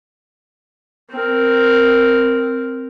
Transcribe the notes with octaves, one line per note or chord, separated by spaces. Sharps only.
C4 A#4